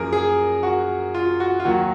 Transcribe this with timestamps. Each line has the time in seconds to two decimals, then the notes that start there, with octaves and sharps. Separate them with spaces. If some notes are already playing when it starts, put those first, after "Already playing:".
Already playing: F#2 F3 A#3 C#4 G#4 A#4
0.13 G#4
0.63 F#4
1.14 F4
1.40 F#4
1.60 F4
1.65 D#2 D#3 F#3 F#4